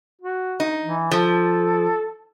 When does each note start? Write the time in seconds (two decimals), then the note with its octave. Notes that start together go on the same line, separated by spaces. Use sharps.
0.21 F#4
0.60 D#4
0.83 E3
1.11 F3 A4